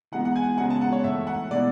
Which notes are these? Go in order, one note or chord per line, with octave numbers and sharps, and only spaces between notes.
E3 G#3 B3 F#5
F#5
G#5
C#3 G#3 B3 F#5
A5
F#5
C#5
A2 E3 A3 E5
F#5
B2 G#3 B3 E4 D5